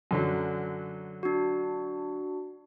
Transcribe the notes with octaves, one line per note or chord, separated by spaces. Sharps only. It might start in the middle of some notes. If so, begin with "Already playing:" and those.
F#2 D3 F#3
D4 F#4